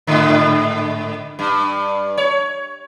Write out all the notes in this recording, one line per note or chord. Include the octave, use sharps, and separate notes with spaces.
G#2 D3
G2
C#5